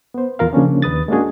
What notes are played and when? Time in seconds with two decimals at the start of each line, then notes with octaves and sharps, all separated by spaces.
0.14 B3 C5
0.39 E2 F4 A#4 F5
0.53 C#3 F3 A#3 C#4 D4
0.82 D#2 B4 D#6 A6
1.08 G#3 A#3 C#4 D4 F#4 G#4